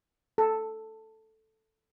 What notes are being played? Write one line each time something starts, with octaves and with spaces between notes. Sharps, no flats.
A4